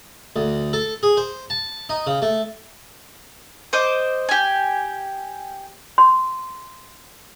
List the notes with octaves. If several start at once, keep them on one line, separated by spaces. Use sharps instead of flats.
D2
A4
G#4
C5
A5
D#4
C#3
A3
C5 D#5 D6
G4 G#5
C6